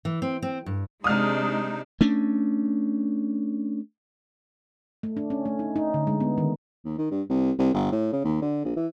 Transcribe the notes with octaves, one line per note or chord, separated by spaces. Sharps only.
E3
C4
C4
G2
C3 G#3 D4 D#4 D#6 F6
A3 C#4 D4
A3
D4
C#4
A3
D#4
D#4
D3
G#3
B3
D#3
D#2
D#3
G2
C2
C2
G1
A2
C#3
D#2
D3
A#1
E3